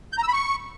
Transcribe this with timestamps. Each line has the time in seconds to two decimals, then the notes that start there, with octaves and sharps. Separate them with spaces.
0.13 G6
0.18 A#5
0.23 E6
0.28 B5
0.33 C#6